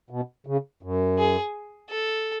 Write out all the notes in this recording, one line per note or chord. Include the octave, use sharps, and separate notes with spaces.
B2
C#3
F#2
G#4
A4